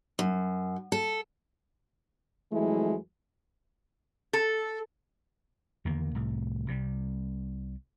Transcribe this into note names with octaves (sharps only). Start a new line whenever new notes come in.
F#2
A4
F2 E3 F#3 G#3 A3 E4
A4
E2 D3 D#3 A#3
C2 A2
C2 C3 E3 G3